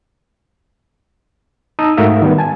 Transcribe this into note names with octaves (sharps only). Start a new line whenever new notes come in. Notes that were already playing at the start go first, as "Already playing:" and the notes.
D#4 A5 A#5 D#6 E6
G#2 A3 F#4 A#4 E5 F5
D#3 G3 B3
G#5 A5